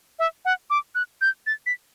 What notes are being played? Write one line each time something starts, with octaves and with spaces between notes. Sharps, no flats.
E5
F#5
D6
F#6
G6
A6
B6